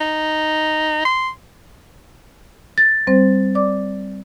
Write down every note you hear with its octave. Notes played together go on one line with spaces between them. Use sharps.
D#4
C6
A6
G3 C4 C5
D5 D6